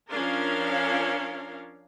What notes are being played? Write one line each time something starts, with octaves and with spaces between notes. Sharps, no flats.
F3 C#4 D4 A#4 F5